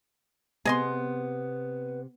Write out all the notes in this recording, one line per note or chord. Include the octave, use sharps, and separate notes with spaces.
C3 B3 G#4 D#5 C6